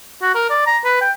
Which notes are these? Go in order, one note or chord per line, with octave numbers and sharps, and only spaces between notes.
F#4
A#4
D5
A#5
B4
G5